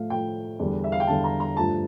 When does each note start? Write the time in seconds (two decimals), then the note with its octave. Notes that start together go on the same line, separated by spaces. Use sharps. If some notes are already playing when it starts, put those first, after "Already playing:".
Already playing: A2 F3 A3 F5
0.10 A2 F3 A3 G5
0.59 E2 D3 G3
0.84 E5
0.92 F5
1.00 G5
1.08 E2 D3 G3 A5
1.24 A#5
1.40 A#5
1.56 G2 F3 A3 A5